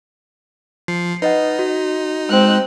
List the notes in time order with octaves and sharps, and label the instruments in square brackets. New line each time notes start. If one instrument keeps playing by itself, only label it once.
[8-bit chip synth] F3 [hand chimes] C7
[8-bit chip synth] D#4 [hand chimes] B4 D#5 F#5
[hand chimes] F#4
[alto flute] G#3 [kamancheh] C4 F#6